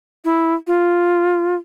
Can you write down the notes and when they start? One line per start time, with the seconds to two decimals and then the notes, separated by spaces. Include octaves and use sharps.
0.25 E4
0.67 F4